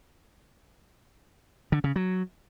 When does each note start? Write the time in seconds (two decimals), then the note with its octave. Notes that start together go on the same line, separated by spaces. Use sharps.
1.72 D3
1.84 C#3
1.96 F#3